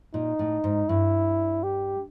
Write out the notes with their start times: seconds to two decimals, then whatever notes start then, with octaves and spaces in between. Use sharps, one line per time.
0.14 A#2 D#4
0.39 A2
0.64 G#2
0.89 G2 E4
1.64 G4